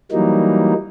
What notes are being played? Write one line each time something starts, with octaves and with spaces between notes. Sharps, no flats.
E3 F#3 G3 A#3 D#4